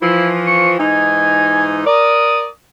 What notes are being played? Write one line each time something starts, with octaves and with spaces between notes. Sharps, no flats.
E3 F3 E4
C#6
G#2 E3 D#4 G#5
A#4 D5 D#6